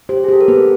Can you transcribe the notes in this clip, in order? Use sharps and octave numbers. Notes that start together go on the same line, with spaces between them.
G4 C5
G#4
G4 A4
A#4
B3 B4